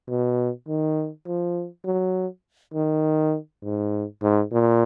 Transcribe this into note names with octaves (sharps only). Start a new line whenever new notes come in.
B2
D#3
F3
F#3
D#3
G#2
G#2
A#2